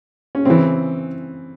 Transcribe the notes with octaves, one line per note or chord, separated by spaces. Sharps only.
C#4
C#3 E3 C4